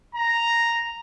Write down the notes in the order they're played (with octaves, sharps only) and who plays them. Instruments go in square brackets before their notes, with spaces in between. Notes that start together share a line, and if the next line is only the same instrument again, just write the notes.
[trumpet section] A#5